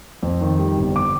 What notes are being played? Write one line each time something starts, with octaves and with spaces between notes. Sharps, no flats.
F2
D#3
G3
G1
D6